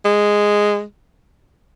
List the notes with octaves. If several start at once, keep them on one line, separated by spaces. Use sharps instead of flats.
G#3